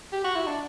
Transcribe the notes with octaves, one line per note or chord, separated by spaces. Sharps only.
G4
F#4
E4
D4